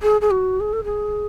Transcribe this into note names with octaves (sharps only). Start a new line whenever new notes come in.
G#4
G#4
F#4
G#4
A4
G#4